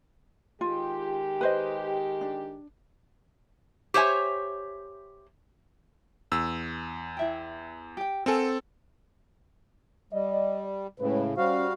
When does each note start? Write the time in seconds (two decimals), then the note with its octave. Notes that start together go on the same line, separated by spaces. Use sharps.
0.61 D#3 G#3 F4 G4
1.41 B4 C5 D#5
2.21 D4
3.94 G4 C5 C#5 E5 G#5
6.32 E2 E6
7.17 E4 E5 G5
7.97 G4 G5
8.26 C4 A4 A#4 F#5 G#5
10.13 G3 D5 D#5
11.00 A2 C#3 G#3 B4
11.37 G3 C#4 F#4 C5 F5